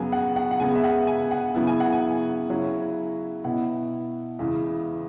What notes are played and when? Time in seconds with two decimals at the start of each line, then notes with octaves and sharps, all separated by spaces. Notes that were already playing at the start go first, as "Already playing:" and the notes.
Already playing: F#2 C#3 F#3 B3 G#5
0.12 F#5
0.36 F#5
0.51 F#5
0.60 C#3 G#3 B3 G#5
0.75 E5
0.84 F#5
1.07 G#5
1.31 F#5
1.55 C#3 F#3 B3 E4
1.67 G#5
1.80 F#5
1.92 G#5
2.50 C#3 F#3 C#4 E4
3.44 B2 B3 E4 F#5
4.39 E2 C#3 G#3 E4